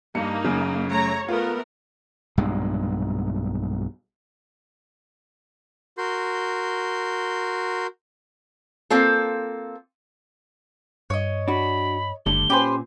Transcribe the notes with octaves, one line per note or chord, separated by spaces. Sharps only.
G2 A#3 D#4 C#7
F#2 C#3
A3 C#5 A#5
A3 B3 F4 A#4
B1 G2 A#2 G#3
F#4 A#4 C6 G6
A#3 C4 F4 A4
G2 C#5 D#5
D4 F#4 B5
F#1 D3 G3 A3 G7
A#2 C#4 G4 B4 C5 G#5